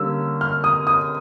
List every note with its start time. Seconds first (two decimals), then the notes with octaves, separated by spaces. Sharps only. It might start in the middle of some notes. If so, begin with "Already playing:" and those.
Already playing: D3 G3 A#3 C#4 E6
0.41 F6
0.64 D#6
0.87 D#6